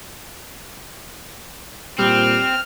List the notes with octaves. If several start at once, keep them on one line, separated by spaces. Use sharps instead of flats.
A#2 G3 C4 F6